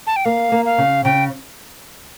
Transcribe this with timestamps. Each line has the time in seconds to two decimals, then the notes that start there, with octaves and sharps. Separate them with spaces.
0.07 A5
0.16 G5
0.25 A#3 F5
0.52 A#3
0.65 F5
0.78 C#3
1.04 C#3 G5